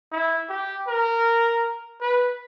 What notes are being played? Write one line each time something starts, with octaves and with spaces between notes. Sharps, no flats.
E4
G4
A#4
B4